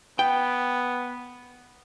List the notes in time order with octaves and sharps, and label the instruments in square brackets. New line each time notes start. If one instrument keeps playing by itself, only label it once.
[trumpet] B3 [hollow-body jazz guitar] G5